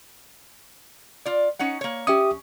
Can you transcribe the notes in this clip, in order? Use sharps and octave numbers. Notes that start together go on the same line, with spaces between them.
F4 D5
C#4 D#4 F#5
A#3 C#5
C#4 G4 E5 D#6